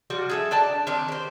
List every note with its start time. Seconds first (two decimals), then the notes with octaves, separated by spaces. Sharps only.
0.10 F3 G3 F#4
0.30 G#4 A4 E5
0.51 D4 D5 G5 A5
0.87 D#3 C4 D4
1.08 G4 C5